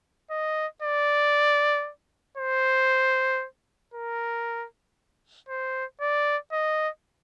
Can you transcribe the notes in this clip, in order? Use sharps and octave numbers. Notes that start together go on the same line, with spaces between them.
D#5
D5
C5
A#4
C5
D5
D#5